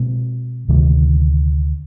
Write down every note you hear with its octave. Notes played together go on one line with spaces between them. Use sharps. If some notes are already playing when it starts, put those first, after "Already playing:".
Already playing: B2 G#3 C4
D2 C3 D#3 G#3